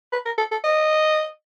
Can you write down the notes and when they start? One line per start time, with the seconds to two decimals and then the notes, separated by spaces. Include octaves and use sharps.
0.13 B4
0.26 A#4
0.38 A4
0.52 A4
0.64 D#5